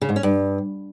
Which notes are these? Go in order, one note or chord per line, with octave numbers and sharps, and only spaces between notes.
C#3
G#2
C#4
G2